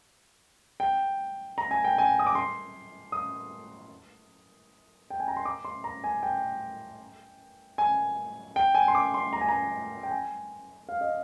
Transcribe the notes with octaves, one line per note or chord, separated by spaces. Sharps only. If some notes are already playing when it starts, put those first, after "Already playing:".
G5
A#5
G#5
G5
G#5
D#6
D6
C6
D#6
G5
G#5
A#5
C6
D6
C6
A#5
G#5
G5
G#5
G5
G#5
C6
D6
C6
A#5
G#5
A#5
G5
G#5
F5
D#5